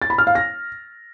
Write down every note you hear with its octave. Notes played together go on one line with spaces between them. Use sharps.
A6
B5
F6
F5
A#6